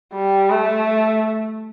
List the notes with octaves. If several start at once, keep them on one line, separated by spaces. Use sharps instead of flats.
G3
A3